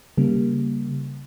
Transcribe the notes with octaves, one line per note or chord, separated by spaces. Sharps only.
C#3 G3 A#3